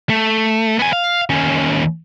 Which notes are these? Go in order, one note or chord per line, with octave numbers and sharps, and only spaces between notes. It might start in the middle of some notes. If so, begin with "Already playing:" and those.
A3
B3 G#5
F5
D#2 C#4